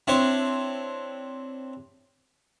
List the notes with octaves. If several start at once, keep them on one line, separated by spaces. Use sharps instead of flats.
C4 D4 E4 C#5